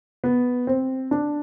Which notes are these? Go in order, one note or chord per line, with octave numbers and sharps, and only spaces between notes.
B3
C4
D4